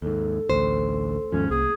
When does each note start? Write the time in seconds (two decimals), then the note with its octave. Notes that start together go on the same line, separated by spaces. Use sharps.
0.02 D#2 G#2 A4
0.50 A1 D2 C5
1.32 D#2 G#2 F3 C#4
1.50 C2 A#3 G#4